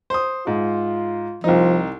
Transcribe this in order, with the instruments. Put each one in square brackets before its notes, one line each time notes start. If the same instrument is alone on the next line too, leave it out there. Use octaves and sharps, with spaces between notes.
[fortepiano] C5 D#6
[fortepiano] G#2 [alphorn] F4
[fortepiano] C2 D#4 [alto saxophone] F3